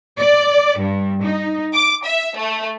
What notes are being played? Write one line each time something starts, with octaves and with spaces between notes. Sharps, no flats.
D5
G2
D#4
D6
E5
A3